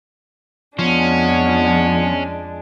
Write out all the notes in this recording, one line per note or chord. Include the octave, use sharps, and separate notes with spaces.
F2 F3 G#3 B3 C#4 D4